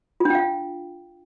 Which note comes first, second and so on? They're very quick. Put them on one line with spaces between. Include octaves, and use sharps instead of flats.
F4 D4 G5 F5